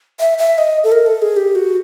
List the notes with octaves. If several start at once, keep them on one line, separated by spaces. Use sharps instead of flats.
E5
E5
D#5
A4
A#4
A4
G#4
G4
F#4